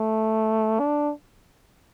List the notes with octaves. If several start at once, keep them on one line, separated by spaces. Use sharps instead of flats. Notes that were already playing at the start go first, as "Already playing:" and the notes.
Already playing: A3
D4